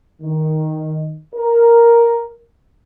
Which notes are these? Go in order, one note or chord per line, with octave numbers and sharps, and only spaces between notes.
D#3
A#4